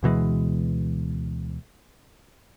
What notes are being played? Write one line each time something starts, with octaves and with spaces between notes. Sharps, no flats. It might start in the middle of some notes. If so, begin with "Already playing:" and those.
D2 B2 E3 G#3